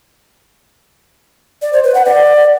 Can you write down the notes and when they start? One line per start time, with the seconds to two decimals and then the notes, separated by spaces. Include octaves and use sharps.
1.62 D5
1.73 C5
1.84 B4
1.94 F#5
2.05 D5